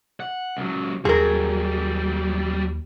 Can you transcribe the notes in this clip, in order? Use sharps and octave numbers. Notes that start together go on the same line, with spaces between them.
F#5
C#2 F#3
D#2 F#3 G3 G#4 A#4